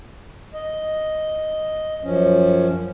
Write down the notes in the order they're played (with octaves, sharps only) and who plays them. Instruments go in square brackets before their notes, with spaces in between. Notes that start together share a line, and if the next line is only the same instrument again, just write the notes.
[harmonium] D#5
F#2 F3 C#4